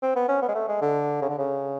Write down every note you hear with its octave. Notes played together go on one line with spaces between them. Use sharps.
C4
B3
C#4
B3
G#3
A3
G#3
D3
C#3
D3
C#3